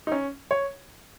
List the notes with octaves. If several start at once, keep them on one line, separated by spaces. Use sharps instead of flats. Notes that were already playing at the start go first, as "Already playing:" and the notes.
D#4
C#4
C#5